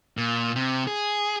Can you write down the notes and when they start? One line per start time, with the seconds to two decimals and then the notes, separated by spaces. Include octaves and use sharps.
0.17 A#2
0.56 C3
0.87 G#4